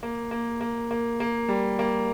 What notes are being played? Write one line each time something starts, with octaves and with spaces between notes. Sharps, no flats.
A#3
A#3
A#3
A#3
A#3
G3
A#3